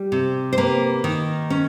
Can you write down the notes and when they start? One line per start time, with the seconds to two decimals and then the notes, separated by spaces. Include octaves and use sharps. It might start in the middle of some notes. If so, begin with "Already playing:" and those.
Already playing: G3
0.12 C3
0.53 C5
0.58 A#3 B4
1.04 D#3
1.50 C#4